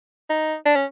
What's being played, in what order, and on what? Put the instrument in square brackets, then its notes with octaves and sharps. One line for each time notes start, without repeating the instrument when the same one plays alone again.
[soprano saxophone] D#4
D4
C#4